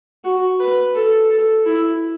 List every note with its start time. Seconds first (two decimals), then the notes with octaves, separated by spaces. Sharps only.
0.24 F#4
0.59 B4
0.95 A4
1.30 A4
1.66 E4